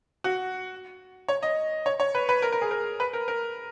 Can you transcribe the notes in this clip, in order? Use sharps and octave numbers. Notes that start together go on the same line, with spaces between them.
F#4
C#5
D#5
C#5
C#5
B4
B4
A#4
A#4
G#4
A#4
B4
A#4
A#4